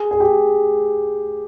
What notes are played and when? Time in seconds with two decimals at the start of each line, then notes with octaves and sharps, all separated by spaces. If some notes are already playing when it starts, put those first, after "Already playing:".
Already playing: G#4
0.11 G#4
0.20 G4